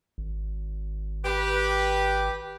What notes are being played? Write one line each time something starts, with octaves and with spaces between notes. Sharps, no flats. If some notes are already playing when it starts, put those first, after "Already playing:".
G#1
G4 B4